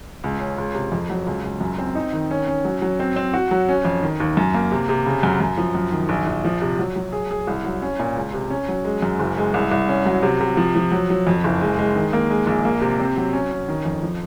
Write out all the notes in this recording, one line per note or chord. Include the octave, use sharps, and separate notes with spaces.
C#2
C#4
C#2
C3
F2
F#3
C#2
C#2
F#2
C4
D#4
D#3
C#4
C#4
F#3
F#3
C4
C4
F#4
F#3
C#4
F2
D#3
D#2
F#2
A#3
C3
C3
C#3
F#2
F#2
F3
F#2
D#3
A#1
A#1
F3
C3
F#3
F#3
G#4
G#4
C2
F#3
C#4
A#2
C#2
C3
C#4
F#3
G#3
F#2
F#1
G#3
C2
C2
C#4
F#3
C3
C3
F3
F3
F#3
F#3
F2
F#1
G#3
G#3
D#3
A#3
G#3
A#1
A#3
C3
C4
F#3
C#4
C#4
D#3
F2
F3